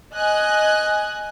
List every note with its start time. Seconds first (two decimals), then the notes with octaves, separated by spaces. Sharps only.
0.14 D#5 G#5 F#6